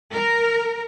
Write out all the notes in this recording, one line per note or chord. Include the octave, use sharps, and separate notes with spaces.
A#4